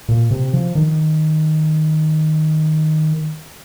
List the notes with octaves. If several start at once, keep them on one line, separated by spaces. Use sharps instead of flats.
A#2
C3
F3
D#3